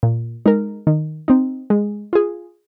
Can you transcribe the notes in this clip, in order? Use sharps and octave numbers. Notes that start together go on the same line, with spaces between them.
A#2
G#3 D#4 A#4
D#3
C4 D#4
G#3
F4 G#4